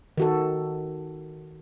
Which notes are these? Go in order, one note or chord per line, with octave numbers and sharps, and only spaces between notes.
D#3 F#4 A4